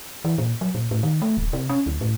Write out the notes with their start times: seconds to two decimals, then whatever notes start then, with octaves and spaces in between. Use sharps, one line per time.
0.25 E3
0.38 A#2
0.61 F#3
0.75 A#2
0.91 A2
1.03 D#3
1.22 A3
1.37 D1
1.53 C3
1.69 C#4
1.86 D2
2.01 A2